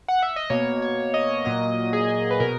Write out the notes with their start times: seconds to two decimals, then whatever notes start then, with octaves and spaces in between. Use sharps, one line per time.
0.08 F#5
0.22 E5
0.36 D#5
0.50 B2 A#3 C#5
0.82 C#5
1.14 D#5
1.44 A#2 F#3 A#3 D#5
1.93 G#4
2.31 B4
2.40 B2 A#4